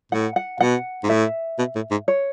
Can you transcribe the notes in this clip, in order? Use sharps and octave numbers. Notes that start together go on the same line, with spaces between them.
A2 F#5
F#5
B2 F#5
G#2
A2 E5
B2
A2
G#2
C#5